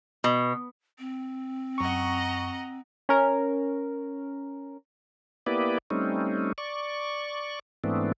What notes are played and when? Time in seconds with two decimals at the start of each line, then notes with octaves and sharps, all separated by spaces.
0.24 B2
0.99 C4
1.78 F#2 D#5 F#5 A#5 C#6
3.09 C#4 A#4
5.46 A#3 B3 E4 G4 B4 D5
5.90 G3 A3 C4 C#4 D#4
6.58 D5 C#6
7.84 G#2 E3 A3 B3 C4 D4